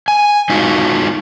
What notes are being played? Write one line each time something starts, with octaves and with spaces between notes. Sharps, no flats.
G#5
G#3 D#4 F4 F#4